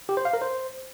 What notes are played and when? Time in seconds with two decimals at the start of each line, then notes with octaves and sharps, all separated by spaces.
0.09 G4
0.17 C5
0.25 F5
0.33 A#4
0.42 C5